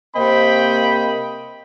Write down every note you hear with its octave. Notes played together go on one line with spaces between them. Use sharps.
C3 A#3 C4 D#5 G5 B5